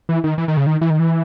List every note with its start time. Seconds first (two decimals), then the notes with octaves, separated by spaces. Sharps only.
0.09 E3
0.24 D#3
0.38 E3
0.48 D#3
0.57 C#3
0.66 D#3
0.81 E3
0.90 D#3
0.99 E3